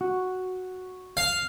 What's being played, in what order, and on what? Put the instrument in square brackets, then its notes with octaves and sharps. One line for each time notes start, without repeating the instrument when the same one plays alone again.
[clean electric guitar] F#4
[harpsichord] F5